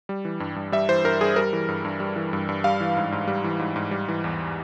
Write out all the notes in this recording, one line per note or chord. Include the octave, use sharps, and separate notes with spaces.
G3
E3
G2
G2
G3 E5
E3 C5
G2 A#4
G2 G#4
G3 A#4
E3
G2
G2
G3
E3
G2
G2
G3 F5
E3
G#2
G#2
G3
E3
G#2
G#2
G3
E3
E2